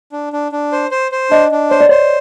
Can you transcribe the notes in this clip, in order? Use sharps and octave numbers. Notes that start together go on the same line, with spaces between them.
D4
D4
D4
C5
C5
C5
D4 D#5
D4
C5 C#5
D5
C5 C#5